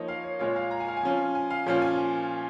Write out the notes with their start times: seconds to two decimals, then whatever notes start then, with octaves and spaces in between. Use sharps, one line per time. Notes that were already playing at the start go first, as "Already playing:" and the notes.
Already playing: F3 A#3 D#4 C#5 D#5
0.08 F5
0.24 C#5
0.39 A#2 G#3 F4 C#5
0.56 F5
0.71 A#5
0.80 G#5
0.88 F5
0.97 G#5
1.03 F3 C#4 F4
1.35 G#5
1.50 F5
1.66 A#2 F3 C#4 F4
1.82 G#5